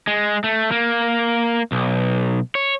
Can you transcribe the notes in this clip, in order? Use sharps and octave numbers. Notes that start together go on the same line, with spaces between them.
G#3
A3
A#3
B1
C#5